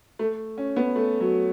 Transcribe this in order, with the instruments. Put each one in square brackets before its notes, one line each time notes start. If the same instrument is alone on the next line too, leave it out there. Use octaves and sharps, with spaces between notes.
[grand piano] A3
C#4
B3
A3
F#3